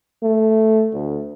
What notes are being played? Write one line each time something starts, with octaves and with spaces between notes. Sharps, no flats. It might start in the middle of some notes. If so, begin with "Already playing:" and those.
A3
D2